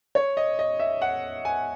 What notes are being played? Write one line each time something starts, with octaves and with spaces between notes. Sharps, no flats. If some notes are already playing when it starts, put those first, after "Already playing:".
C#5
D#5
D#5
E5
F#5
G#5